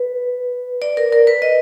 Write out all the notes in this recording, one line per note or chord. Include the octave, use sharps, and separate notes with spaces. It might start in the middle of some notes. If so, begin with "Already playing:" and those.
Already playing: B4
D5
A#4
A#4
B4
D#5